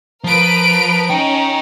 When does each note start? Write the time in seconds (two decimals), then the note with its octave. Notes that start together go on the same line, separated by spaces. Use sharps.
0.24 F3 A#4 B4 D7
1.10 C#4 D#4 D#5 G5